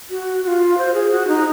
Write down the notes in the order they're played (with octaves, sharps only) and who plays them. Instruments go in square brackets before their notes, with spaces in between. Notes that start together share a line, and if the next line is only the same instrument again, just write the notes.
[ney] F#4
F#4
F4
C5
G#4
F#4
D#4